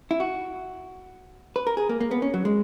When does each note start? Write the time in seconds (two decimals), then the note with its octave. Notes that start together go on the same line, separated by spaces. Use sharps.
0.11 E4
0.20 F#4
1.56 B4
1.67 A#4
1.77 G#4
1.89 A#3
2.01 A#3
2.11 B3
2.22 C#4
2.34 F#3
2.45 G#3